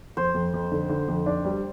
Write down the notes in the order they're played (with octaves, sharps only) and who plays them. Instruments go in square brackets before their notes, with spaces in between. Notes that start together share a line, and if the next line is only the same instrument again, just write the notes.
[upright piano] F2 [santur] C5
[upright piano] F2
F2
D3
D3
F2
D4
G3